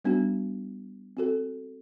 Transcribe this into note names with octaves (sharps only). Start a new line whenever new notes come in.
G3 B3 D4 F#4
C4 F#4 A4